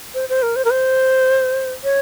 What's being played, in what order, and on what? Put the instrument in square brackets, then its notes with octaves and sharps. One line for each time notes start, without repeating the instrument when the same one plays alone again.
[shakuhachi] C5
C5
A#4
C5
A#4
C5
C#5